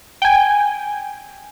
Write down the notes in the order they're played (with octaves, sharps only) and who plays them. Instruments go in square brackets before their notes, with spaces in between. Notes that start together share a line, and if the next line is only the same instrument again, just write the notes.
[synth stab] G5 G#5